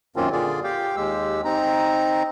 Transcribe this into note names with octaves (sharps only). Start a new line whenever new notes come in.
F#2 D#3 A#3 C4 C#4 F4
A#2 D3 F4 G#4 D5
G4 F5 G5
D#2 G#3 G4 E6
C4 D#4 A#5